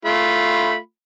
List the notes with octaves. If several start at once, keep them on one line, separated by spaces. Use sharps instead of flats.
A3 F4 B5